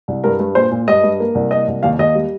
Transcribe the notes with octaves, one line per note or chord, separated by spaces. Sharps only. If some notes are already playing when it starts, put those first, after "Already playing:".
C2
G2 A#4
G2
A#2 C5
A#2
G2 D#5
G2
A#3
C2
A#3 D#5
C2
D#2 F5
D#2 D#5
G3